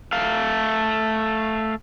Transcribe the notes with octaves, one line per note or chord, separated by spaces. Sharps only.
A3 F5